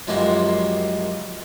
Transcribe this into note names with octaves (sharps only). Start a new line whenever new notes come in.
F#2 F3 G3 G#3 A#3 C4